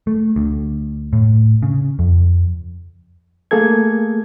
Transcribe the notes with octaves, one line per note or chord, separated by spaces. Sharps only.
A3
D2
A2
C#3
F2
A3 A#3 G#4 A4 G#6